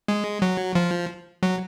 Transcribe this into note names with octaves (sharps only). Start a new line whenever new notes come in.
G#3
F#3
F3
F#3